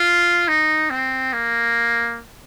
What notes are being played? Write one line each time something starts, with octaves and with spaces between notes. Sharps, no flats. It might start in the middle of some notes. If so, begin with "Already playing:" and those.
Already playing: F4
D#4
C4
A#3